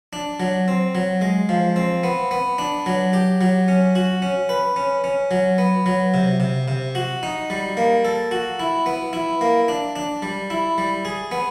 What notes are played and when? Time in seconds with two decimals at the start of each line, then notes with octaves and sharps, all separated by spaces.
0.13 D4
0.40 F#3
0.68 C4
0.95 F#3
1.21 G#3
1.49 F3
1.76 C4
2.03 B3
2.31 B3
2.58 D4
2.86 F#3
3.13 G4
3.41 F#3
3.68 C#4
3.95 F#4
4.22 C#4
4.49 B4
4.76 C#4
5.04 C#4
5.31 F#3
5.58 B3
5.86 F#3
6.14 C3
6.40 C3
6.68 C3
6.95 F#4
7.23 D#4
7.50 G3
7.77 A#3
8.05 A4
8.31 F#4
8.60 E4
8.86 B3
9.13 E4
9.41 A#3
9.68 D4
9.96 D4
10.22 G3
10.50 E4
10.78 G3
11.05 G#4
11.31 B3